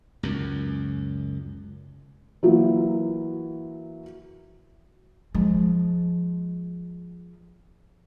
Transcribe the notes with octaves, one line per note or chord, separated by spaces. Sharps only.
C#2 F#2
E3 F#3 A#3
F3 G#3